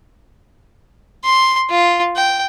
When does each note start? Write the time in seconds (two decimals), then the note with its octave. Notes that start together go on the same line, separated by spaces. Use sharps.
1.24 C6
1.69 F4
2.16 G5